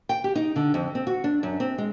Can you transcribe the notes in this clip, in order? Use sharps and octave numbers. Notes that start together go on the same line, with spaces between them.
G5
G4
D#4
D3
F2
C4
F#4
D4
F#2
C4
G#3